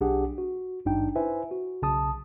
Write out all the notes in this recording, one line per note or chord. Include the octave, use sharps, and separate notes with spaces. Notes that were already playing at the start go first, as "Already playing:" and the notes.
B1 D4 G4 G#4 F#5
F#4
G#1 G2 D4 D#4 G5
E4 B4 C5 E5 G#5
F#4
B1 C#3 A5 D#6